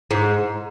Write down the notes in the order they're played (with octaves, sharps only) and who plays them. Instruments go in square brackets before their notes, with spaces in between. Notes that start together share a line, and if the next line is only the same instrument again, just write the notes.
[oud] G#2